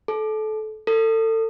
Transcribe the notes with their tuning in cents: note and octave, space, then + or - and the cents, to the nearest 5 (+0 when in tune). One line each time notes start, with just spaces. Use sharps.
A4 -25
A4 +30